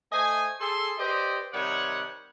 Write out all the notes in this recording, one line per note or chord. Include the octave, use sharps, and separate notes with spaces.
A3 C5 D#5 G#5
G#4 A4 C6
G4 B4 C5 D5 D#5
C3 D#3 G3 C#5 F#5